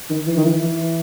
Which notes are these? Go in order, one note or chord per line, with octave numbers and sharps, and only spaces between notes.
D#3
E3
D#3
E3
E3